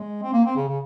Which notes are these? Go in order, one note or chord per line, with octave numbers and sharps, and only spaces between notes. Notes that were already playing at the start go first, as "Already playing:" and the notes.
Already playing: G#3
C4
A#3
C4
C#3
C#3